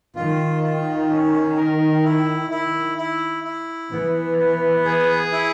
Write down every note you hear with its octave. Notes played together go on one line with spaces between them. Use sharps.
D#3 F4
F4
C#4
A#4
E4
E4
E4
E4
E3 B3
B3
G#4
E4